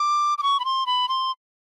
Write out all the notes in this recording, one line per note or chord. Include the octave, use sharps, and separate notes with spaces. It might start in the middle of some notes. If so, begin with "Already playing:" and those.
Already playing: D6
D6
C#6
B5
C6
B5
C6